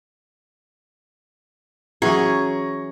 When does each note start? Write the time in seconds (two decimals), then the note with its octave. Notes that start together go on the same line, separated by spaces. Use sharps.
2.02 E3 F#3 C#4 G#4 A#5 C#6